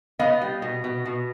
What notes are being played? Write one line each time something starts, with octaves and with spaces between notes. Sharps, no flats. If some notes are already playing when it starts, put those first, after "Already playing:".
B3 D#5 F5
G3
B2
B2
B2